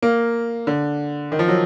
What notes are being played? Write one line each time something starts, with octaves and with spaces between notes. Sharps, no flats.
A#3
D3
D#3
F3
F#3